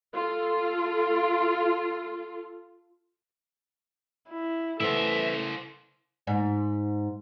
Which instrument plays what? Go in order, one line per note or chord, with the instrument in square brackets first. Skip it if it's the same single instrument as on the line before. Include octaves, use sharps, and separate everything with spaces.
[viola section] F4 A4
[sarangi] E4
[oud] E3 A3 B3 [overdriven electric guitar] E4 C5 [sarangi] A4 [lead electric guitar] E5
[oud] G#2